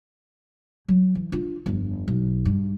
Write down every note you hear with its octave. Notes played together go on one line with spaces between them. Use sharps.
F#3
E3
D4 F4
G1 F2
B1
G2